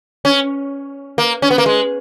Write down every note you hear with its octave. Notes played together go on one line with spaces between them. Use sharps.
C#4
A#3
C#4
B3
A#3
G#3